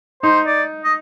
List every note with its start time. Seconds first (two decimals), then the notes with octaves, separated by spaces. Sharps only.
0.23 D#4 C5
0.47 D5
0.84 D#5